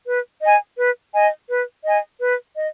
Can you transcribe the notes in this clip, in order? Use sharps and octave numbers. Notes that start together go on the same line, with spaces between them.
B4
D#5 G#5
B4
D#5 G#5
B4
D#5 G#5
B4
D#5